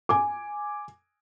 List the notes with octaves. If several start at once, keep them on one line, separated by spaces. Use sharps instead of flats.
G#5 D6